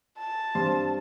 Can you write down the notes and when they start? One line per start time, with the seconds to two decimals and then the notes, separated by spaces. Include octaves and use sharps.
0.19 A5
0.55 G2 C4 C6